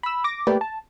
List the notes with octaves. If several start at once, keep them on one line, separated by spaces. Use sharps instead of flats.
B5 E6
D6 A#6
A3 A#3 G4 B4 D5
A5